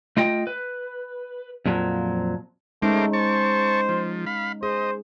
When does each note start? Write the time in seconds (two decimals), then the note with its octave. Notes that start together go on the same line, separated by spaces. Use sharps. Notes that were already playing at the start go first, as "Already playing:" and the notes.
0.17 A3 F4 D#5 G5
0.47 B4
1.66 F2 A#2 F3 F#3
2.82 G#3 A3 C#4 D#4 A#4 C5 D6
3.13 C5 A5 C#6
3.89 F3
4.26 F5 B5
4.63 G#4 C5 D#5